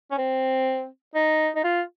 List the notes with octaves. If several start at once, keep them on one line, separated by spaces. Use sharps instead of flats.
C#4
C4
D#4
D#4
F4